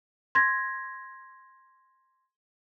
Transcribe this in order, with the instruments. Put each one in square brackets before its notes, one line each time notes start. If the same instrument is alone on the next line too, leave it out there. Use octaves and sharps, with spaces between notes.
[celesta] C6 G#6 A#6